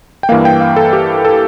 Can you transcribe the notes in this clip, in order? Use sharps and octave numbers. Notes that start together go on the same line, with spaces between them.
G5
G2 E3 A#3 F5
G5
F5
A4
G4
A4